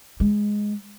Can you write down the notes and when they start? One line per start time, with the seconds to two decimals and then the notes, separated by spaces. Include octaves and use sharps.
0.20 G#3